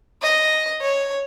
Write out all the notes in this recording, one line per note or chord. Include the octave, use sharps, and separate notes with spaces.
D#5
C#5